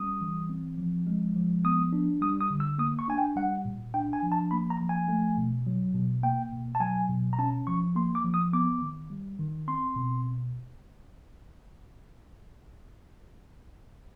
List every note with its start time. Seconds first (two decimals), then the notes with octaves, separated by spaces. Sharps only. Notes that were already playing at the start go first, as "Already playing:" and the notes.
Already playing: G3 C#4 D#6
0.21 E3
0.49 C4
0.78 F3
1.07 G#3
1.35 F3
1.64 B3 D#6
1.93 D4
2.21 G3 D#6
2.41 D#6
2.51 D3
2.60 E6
2.78 A#3 D#6
2.99 C#6
3.08 D4 G#5
3.18 G5
3.36 G3 F#5
3.65 A#2
3.94 D4 G5
4.13 G#5
4.23 F3
4.32 A5
4.51 A#3 B5
4.70 A#5
4.80 F3
4.89 G#5
5.08 A3
5.38 B2
5.67 F#3
5.95 B2
6.23 A#3 G5
6.52 B2
6.75 A5
6.80 F#3 G#5
7.09 B2
7.33 A#5
7.39 C#4 A5
7.67 F3 C#6
7.96 A#3 C6
8.15 D6
8.24 F3
8.34 D#6
8.53 B3 D6
8.82 D#3
9.10 G3
9.39 D#3
9.68 C4 C6
9.96 B2